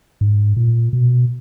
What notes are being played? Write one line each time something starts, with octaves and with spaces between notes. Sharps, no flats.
G#2
A#2
B2